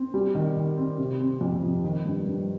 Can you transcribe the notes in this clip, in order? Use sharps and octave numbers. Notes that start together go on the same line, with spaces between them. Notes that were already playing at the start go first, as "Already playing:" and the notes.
Already playing: C4
G3
D#3
D#3
C4
C3
C4
F2
F3
D#3
G2
G2